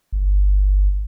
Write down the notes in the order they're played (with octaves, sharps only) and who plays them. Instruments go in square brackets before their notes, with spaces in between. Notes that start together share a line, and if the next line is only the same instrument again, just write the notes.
[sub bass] G1